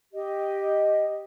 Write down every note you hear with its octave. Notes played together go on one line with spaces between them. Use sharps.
G4 D#5